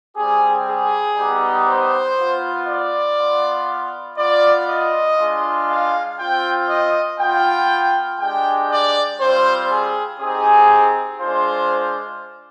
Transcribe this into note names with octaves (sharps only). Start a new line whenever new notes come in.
G3 C4 G4 G#4
G#4
G3 B3 D#4 G4
C5
B3 F4
D5
B3 F4
B3 F4 D5
D#5
G#3 D4 F4
F5
C4 F4 G5
D#5
B3 F4 G5
G#3 D4 G4 G5
D5
G3 C4 F4 C5
G#4
C4 D#4 G4 G#4
G#3 D4 F4 C5